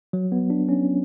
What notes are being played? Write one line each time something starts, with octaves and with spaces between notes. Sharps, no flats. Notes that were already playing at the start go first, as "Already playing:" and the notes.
F#3
B3
D4
C#4